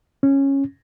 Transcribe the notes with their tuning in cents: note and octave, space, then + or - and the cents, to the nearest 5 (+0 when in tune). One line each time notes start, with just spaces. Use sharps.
C#4 -10